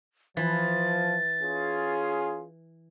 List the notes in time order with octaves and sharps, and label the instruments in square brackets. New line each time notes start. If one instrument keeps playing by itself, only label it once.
[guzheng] E3 [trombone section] F3 [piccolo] A6
[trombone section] C#4 F4 G#4